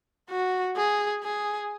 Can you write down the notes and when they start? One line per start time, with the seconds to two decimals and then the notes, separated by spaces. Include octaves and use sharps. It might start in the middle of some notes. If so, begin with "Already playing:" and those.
0.30 F#4
0.76 G#4
1.24 G#4